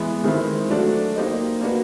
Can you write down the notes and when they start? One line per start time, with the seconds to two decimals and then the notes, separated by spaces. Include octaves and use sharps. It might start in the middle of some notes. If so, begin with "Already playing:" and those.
Already playing: E3 G#3 B3
0.24 D#3 G#3 C4 E4
0.69 F#3 A3 D4 F#4
1.16 A#3 D#4 G4 C5 D#5
1.61 A#3 D4 F#4 B4